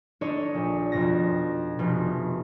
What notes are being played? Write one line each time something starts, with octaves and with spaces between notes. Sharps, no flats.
D4 D#4 A4 C#5 D#5
A#1
F2 B2 A#6
F1 B2